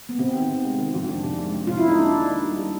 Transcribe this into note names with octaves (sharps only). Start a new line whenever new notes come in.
B3
C3 C4
D#3
C3
G#3
D#3
F2
D#3 D4
C3
G#3
G#3
C3 F4
E4
G#3 D#4
A#3 D4
D#3
D#3
G3
G3